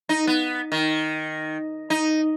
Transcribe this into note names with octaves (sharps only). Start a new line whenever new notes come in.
D#4
B3
D#3
D#4